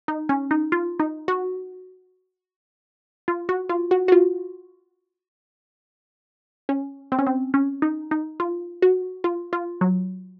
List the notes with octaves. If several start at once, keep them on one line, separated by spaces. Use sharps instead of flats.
D#4
C#4
D#4
F4
D#4
F#4
F4
F#4
F4
F#4
F#4
F4
C#4
C4
C#4
C4
C#4
D#4
D#4
F4
F#4
F4
F4
F#3